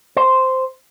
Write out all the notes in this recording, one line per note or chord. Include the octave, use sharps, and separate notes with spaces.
C5